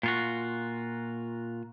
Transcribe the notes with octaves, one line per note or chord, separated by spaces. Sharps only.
A#2 F4 F#4